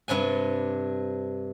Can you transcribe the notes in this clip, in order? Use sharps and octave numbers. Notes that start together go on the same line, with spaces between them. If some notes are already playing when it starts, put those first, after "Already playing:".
G2 C3 D4 G#5